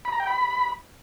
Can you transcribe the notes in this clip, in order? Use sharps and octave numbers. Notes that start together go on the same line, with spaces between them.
B5
A#5
G5
B5